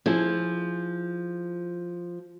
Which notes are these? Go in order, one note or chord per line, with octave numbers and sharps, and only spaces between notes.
F3 E4 G#4